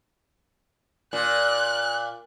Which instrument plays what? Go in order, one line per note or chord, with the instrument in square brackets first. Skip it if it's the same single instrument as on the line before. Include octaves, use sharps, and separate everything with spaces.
[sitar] A#2 [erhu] F#6